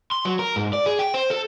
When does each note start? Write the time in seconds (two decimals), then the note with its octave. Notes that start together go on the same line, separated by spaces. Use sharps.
0.11 C6
0.25 F#3
0.39 A#4
0.56 G#2
0.73 D5
0.86 G#4
0.99 G5
1.14 C5
1.30 A4